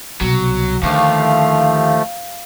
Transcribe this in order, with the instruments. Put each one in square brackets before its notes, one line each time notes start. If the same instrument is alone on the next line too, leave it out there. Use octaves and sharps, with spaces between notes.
[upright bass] C2 B2 [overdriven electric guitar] F#3
[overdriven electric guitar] D#2 [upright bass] D3 [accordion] F3 A3 [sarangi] F5